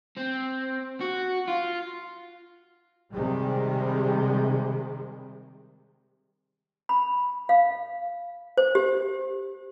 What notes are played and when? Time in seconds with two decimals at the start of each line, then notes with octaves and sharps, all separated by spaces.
0.17 C4
1.01 F#4
1.48 F4
3.13 C3 D#3 G3 G#3
6.89 B5
7.49 F5
8.57 C5
8.75 G4